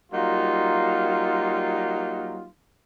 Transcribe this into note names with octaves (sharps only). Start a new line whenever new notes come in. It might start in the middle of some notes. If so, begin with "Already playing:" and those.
F#3 G3 A#3 D#4 F4